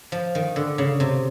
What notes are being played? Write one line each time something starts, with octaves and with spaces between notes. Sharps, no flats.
F3
D#3
D3
C#3
C3